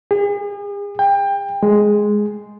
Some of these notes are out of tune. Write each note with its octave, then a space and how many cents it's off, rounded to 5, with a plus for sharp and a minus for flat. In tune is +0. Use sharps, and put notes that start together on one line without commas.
G#4 -45
G5 +25
G#3 +5